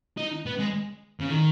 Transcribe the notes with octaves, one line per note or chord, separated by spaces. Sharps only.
D#4
B3
G#3
C#3
D#3